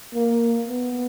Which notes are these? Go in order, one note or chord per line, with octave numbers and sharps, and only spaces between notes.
A#3
B3